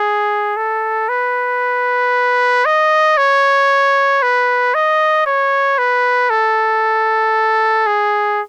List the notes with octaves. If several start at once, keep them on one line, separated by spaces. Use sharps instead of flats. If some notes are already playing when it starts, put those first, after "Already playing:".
Already playing: G#4
A4
B4
D#5
C#5
B4
D#5
C#5
B4
A4
G#4